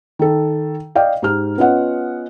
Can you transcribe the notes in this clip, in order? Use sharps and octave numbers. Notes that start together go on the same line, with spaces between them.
D#3 A4
D5 D#5 F5 G5
G#2 D#4 G4 F6
B3 C#4 F4 D#5 F#5